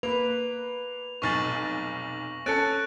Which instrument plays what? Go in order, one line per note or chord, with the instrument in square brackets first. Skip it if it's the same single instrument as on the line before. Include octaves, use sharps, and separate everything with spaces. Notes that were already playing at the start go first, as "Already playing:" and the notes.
[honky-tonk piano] A#3 [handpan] B4 [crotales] F7
[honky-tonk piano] F1 B1 A6 [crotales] C#6 A#6 F#7
[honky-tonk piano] C#4 A4 C#7 [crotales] F#6 A6 D7